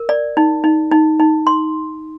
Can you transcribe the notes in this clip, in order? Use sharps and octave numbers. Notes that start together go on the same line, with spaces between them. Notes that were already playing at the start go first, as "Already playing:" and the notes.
Already playing: A#4
D5
D#4
D#4
D#4
D#4
C6